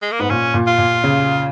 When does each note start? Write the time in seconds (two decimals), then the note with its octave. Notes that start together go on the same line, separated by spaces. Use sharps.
0.02 G#3
0.12 A#3
0.19 G#2 B3
0.30 A#2 C#4
0.54 A#2
0.67 F4
0.78 A#2
1.04 C#3